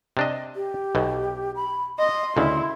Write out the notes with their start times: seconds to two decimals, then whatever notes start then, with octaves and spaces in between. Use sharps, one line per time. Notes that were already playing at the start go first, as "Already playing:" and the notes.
0.17 C3 D4 D#5
0.56 G4
0.95 B1 B2
1.56 B5
1.99 D#5 C6
2.37 D2 C#3 E4